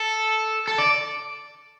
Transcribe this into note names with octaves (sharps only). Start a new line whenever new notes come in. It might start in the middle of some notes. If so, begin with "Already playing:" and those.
Already playing: A4
A4
D5